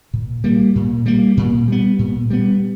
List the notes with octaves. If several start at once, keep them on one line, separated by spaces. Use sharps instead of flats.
A#2
G3 A#3
A#2
G3 A#3
A#2
G3 B3
A#2
G3 B3